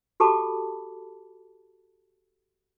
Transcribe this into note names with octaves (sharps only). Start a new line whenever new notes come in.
F#4 G4 A4 A5 B5 D6